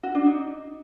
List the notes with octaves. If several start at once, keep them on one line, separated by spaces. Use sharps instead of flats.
F#4
D4
D#4